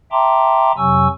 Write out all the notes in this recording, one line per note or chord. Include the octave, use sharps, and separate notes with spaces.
E5 G5 A5 A#5 C6 D6
F2 C3 F#3 G#5 C#6 E6